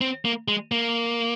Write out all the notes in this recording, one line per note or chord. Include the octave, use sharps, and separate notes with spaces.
C4
A#3
G#3
A#3